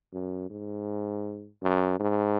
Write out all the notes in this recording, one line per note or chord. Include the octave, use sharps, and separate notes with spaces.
F#2
G#2
F#2
G#2